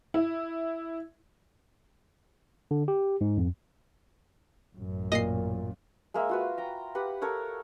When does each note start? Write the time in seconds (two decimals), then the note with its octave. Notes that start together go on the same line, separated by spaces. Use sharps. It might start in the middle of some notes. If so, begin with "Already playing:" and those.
0.14 E4
2.71 D3
2.88 G4
3.21 G#2
3.37 F2
4.76 A1 F#2
5.12 A#2 D#5 C7
6.14 G#3 A#3 E5
6.29 F4 F#4 B4
6.58 G5 A#5
6.95 G4 B4 F#5
7.21 A4 A#4 C#5 F#5